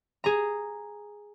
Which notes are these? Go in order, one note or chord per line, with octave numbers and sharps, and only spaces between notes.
G#4 A#5